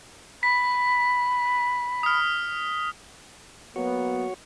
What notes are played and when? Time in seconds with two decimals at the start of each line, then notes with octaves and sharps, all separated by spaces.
0.43 B5 B6
2.03 D#6 F6
3.76 F#3 A#3 B3 F#4 C#5